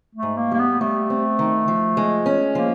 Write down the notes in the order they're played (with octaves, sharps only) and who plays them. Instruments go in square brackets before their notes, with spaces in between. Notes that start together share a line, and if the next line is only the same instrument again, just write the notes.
[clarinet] A3
[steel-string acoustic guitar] G#2
[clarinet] A#3
[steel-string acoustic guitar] G3 [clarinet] A#3
[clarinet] B3
[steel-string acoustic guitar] G3 [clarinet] A3
[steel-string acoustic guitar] C4
D#3
F3
G#3
C#4
[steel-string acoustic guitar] F3 [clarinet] A#3